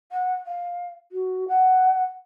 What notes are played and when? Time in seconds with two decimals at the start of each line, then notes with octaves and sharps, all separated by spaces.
0.11 F#5
0.46 F5
1.12 F#4
1.48 F#5